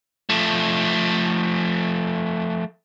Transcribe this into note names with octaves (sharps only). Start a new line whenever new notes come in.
F3 A3